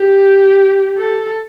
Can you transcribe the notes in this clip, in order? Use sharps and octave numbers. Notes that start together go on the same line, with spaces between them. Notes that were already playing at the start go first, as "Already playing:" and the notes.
Already playing: G4
A4